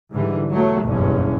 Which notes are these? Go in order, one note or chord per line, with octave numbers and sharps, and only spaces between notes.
G#2 D3 E3 G3
B1 F#3 A3
F#1 B1 E2 G2 C#4